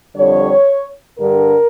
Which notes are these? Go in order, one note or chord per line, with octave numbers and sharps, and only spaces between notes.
F2 D3 G3 C#5
G2 D3 G3 A#4